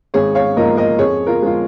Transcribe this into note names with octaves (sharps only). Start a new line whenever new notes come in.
G#1 G#4 C#5
C#5 F5
G#2 F3 A#3 A#4 D#5
A#4 D#5
F2 G#4 C#5
F4 A#4
F3 G#3 F4